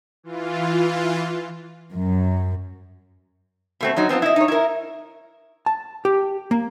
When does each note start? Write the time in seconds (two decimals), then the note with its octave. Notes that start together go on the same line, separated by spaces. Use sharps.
0.23 E3 F4
1.91 F#2
3.81 B2 A3 C4
3.96 F#2 F#3 D#4
4.09 B3 C4 D4 F4
4.22 E4 D#5
4.36 D#4 C#5
4.48 E4 A#4
5.66 A5
6.05 G4
6.51 A#3